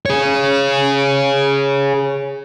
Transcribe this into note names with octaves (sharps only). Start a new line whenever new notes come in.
G#4 C#5